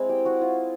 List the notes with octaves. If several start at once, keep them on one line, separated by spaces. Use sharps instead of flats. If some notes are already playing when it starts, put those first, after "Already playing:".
Already playing: G#3 C4 E4
G4 G5
F#4 F#5
F4 F5